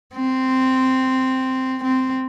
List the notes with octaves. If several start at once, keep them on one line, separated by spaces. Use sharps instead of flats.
C4
C4